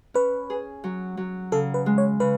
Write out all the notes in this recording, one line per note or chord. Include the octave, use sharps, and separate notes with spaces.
C#4 B4
G#4
F#3
F#3
C#3 A4
B4
G#3
C#5
C#3 B4